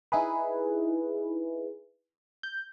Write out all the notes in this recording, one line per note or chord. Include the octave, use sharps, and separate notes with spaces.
D#4 E4 G#4 B4
G6